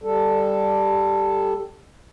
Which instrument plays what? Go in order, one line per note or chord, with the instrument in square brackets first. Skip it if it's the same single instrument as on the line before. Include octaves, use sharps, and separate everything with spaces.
[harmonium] G3 A4